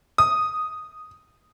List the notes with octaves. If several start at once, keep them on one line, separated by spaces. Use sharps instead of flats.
D#6